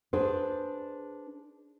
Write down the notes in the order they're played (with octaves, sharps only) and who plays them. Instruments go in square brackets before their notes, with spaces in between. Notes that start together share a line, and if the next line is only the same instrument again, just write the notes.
[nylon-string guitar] D4 G#4 B4 C5